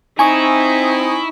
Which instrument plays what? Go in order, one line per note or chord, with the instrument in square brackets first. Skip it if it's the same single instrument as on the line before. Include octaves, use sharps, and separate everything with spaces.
[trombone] C4 [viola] D#4 [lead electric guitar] E4 [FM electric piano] G#5 C#6 D#6